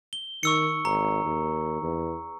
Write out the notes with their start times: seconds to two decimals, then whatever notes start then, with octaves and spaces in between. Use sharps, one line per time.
0.13 G7
0.43 D#3 C#6 E6 C#7
0.85 G#1 A#5
1.25 D#2
1.82 E2